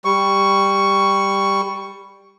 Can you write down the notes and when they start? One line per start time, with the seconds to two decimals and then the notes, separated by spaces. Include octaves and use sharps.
0.05 G3 C#6